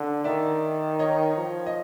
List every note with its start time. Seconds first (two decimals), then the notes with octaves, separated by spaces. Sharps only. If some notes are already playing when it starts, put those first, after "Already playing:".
Already playing: D3
0.24 D#3 D5 E5
0.99 C#5 D#5
1.37 F3
1.66 D#5